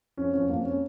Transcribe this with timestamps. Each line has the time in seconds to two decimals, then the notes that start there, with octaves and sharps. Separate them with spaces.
0.17 F2 C#4
0.33 F2 C#4
0.49 F2 A#3
0.65 C#4